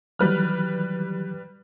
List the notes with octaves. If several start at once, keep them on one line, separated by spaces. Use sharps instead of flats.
D#3 E3 F#3 G3 B4 F6